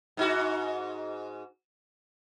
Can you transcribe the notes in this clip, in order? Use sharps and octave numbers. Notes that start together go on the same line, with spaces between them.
G#2 D#4 F#4